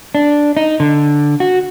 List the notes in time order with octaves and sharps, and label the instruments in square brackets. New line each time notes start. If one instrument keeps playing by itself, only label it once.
[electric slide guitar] D4
D#4
D3
F#4